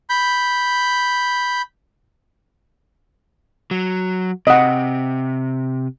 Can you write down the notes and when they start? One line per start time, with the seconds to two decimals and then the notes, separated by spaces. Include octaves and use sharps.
0.10 B5 G6
3.71 F#3
4.47 C3 D#5 F#5